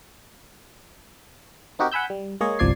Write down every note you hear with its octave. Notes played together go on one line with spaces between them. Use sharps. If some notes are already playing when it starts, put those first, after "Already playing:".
C4 D#4 F#4 G4 A#4
F#5 G#5 B5 E6 G6
G3
G#3 A#3 G#4 C#5 D#5
G1 C2 F3 D5 G#6 C7